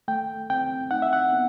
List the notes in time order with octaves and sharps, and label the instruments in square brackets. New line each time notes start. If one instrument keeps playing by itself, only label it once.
[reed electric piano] A3 G5
C4 G5
D#4 F#5
E5
F#5
B3